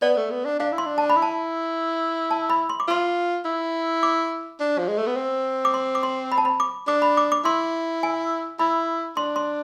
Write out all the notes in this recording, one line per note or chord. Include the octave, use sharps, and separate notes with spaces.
B3 D5
A3
B3
D4
D4 F5
E4
C6
D4
A5
B5
E4
A5
A5
B5
C6
D6
F4 C6
E4
D6
D4
F3
G#3
A3
B3
C4
D6
C6
D6
C6
B5
A5
B5
D6
D4 D6
B5
D6
D6
E4 C6
G#5
E4 B5
D4 C6
C6